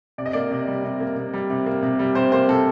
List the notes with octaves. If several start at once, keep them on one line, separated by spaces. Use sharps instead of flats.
C3 D5
D#5
A#3 D5
C3
G3
C3
A#3
C3
G3
C3
A#3
C3
G3
C3 C5
A#3 C5
C3 A4